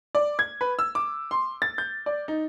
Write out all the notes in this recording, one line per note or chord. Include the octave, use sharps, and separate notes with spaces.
D5
G#6
B4
E6
D6
C6
A6
G6
D5
D#4